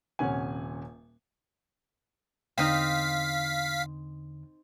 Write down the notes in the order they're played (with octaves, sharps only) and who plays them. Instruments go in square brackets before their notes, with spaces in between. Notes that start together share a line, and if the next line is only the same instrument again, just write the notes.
[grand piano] D#1 C3 C#4 F#5 G#5
[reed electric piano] E2 D3 [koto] C4 D#4 A#5 [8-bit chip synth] F5 B6